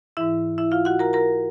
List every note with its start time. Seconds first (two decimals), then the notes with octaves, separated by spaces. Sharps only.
0.17 G#2 E3 E4 E5
0.58 E4 E5
0.71 F4 F5
0.85 F#4 F#5
0.99 A#4 A#5
1.13 A#4 A#5